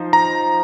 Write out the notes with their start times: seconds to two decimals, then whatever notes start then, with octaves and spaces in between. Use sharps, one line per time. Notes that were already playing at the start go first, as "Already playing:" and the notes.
Already playing: F3 D#4 C5
0.13 A#5